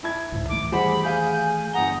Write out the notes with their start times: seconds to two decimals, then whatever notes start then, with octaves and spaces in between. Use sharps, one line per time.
0.03 E4 A5 G#6
0.32 C#2 G#2
0.49 D#3 E3 A3 D6
0.72 G3 G#4 C5 F#5 B5
1.03 G#4 F5 G#5 G6
1.73 G1 F#5 A#5 D#6 G7